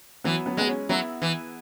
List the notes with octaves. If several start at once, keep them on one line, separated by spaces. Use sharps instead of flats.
E3 F#3 B3
F#3 B3
G#3 B3
G#3 C#4
F#3 B3 E4
E3